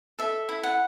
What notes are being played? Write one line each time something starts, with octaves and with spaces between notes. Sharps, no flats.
A4 E5
E4
F#5